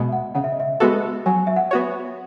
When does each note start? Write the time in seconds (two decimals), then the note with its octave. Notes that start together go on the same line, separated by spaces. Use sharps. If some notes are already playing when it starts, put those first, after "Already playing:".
Already playing: B2 G#3 B3
0.09 E5
0.12 F#5
0.35 C#3 F#5
0.44 E5
0.52 D#5
0.60 E5
0.80 G#3 B3 F#4 A4
1.26 F#3 G#5
1.47 E5
1.56 F#5
1.71 B3 F#4 C#5